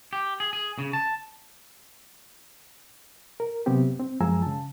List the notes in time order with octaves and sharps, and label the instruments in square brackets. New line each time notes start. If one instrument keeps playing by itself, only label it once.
[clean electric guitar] G4
G#4
G#4
C#3
A5
[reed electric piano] A#4
C3 F#3 B3 C4 G4
C4
F#2 F3 G#3 G#5 A#5 E6
C#3 A5